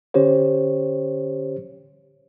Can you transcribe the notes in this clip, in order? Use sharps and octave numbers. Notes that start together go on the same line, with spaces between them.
D3 C#4 G4 C5 C#5